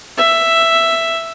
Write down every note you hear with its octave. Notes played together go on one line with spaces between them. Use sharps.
E5